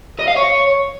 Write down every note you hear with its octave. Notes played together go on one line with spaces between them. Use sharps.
D#5
F5
C#5